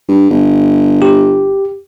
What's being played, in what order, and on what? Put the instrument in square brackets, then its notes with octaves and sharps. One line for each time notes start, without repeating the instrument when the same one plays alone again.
[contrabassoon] G2
G1
[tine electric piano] G4